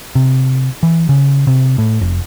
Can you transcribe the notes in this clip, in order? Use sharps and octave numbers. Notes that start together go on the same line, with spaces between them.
C3
E3
C#3
C3
A2
F1